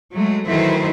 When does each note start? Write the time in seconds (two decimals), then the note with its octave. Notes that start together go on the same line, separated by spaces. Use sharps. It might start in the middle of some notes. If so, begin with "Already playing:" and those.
0.13 F#3 G#3 A3
0.46 D#3 E3 F#3 A3 E4 C5